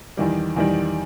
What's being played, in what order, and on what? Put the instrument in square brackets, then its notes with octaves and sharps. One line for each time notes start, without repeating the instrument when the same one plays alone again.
[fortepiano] E2 D#3 G3
E2 D#3 G3